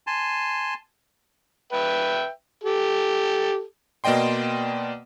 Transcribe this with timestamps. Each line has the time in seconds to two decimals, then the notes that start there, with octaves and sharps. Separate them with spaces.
0.07 G#5 A5 C6
1.73 B4 E5 G5
2.64 G4 A4
4.04 B2 A#3 D5 D#5 G5 C6